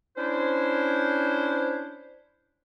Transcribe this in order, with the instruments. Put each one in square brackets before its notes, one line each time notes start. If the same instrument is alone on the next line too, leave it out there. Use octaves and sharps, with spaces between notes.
[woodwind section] C#4 D4 E4 C5